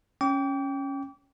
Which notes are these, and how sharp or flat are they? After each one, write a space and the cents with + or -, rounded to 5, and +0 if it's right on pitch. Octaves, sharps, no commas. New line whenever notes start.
C#4 -5 G5 +0 D6 -40